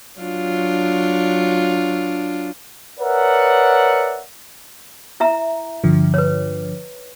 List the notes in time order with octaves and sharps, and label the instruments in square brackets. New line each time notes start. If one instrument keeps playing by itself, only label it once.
[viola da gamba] F#3 D4 F4
[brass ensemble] A#4 B4 C#5 D5 E5 F#5
[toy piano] E4 E5 A#5
[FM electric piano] G2 D3 F3
[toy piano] B4 C#5